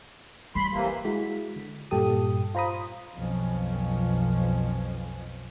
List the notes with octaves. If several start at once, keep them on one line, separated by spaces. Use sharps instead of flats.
G3 B5 C6
C3 E3 A#3
G#3 E4 F#4 B6
D3
G2 A#2 G3 G4 A4 D#6
F4 C5 A#5 B5 D#6
B1 F2 F3 C4 C#4